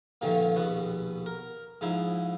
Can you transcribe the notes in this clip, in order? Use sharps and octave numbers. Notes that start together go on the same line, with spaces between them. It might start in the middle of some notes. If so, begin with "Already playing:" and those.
G2 A#2 D3 D#3 F3 A3
A#1 D#2 B2 B3 F#4
A#4
G#2 F3 D#4 E4